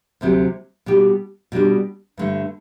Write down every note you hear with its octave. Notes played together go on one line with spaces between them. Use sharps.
D2 C3 F#3 C4 G4
B2 G3 D4 G4
B2 G3 D4 G4
G2 D3 A3